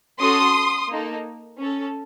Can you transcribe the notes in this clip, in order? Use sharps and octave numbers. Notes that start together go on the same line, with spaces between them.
C#4 F#4 A4 C6 D#6
A#3 D#4 A4
C#4 A4